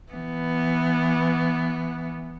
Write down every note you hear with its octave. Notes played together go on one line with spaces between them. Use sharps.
E3 B3